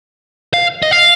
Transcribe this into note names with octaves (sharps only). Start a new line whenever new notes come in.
F5
D#5
F5